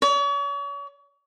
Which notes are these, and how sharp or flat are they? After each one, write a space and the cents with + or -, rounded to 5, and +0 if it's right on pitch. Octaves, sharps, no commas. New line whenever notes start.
C#5 +40